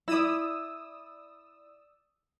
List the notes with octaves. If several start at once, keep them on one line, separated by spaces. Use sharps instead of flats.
E4 D5 D#6 E6